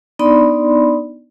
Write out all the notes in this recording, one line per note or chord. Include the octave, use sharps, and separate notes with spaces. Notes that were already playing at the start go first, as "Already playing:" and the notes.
B3 D4 D#4 D5 B5 C6